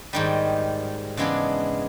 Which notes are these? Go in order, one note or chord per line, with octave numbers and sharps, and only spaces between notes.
G#2 D#3 G3
C#3 E3 G#3 B3 D4